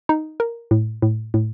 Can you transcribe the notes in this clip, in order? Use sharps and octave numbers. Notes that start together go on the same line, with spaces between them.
D#4
A#4
A2
A2
A2